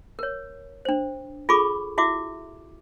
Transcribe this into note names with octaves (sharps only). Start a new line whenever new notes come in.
A#4 C#5
D4 C5
F4 G#4 A4 B5 C#6 D6
E4 F#4 E5 D6